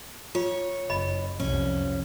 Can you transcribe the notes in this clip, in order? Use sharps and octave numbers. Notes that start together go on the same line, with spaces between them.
F4 C#5
F#1 D#5 B5
C2 F2 C#4